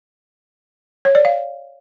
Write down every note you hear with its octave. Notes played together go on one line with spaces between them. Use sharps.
C#5
D5
F5